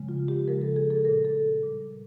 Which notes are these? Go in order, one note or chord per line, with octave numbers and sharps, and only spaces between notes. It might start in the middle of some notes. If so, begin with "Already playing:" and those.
Already playing: C#3 F3 G#3
F4
G4
C#3 F3 G#3 A#4
A4
G#4
A4
A#2 G3 A#4
A4
A#2 G3